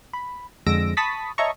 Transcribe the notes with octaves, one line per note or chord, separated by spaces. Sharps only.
B5
F2 D3 G#3 E6 A#6 D7
A5 B5 C#6 D#6 A6 B6
C#5 D#5 E5 A5 A#5 C#6